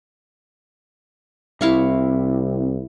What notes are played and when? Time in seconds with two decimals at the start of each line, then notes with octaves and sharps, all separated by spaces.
1.61 C2 C3 E4 F5 C#6